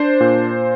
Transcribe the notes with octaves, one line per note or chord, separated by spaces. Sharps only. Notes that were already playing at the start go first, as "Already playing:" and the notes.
Already playing: D4 C5
A#2